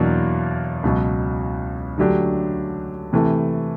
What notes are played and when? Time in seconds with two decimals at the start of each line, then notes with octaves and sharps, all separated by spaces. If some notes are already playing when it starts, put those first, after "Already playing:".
Already playing: E2 B2 F#3 A#3 D4
0.83 C#2 B2 F#3
1.98 D3 F#3 A3 D4 G4
3.13 C3 E3 A3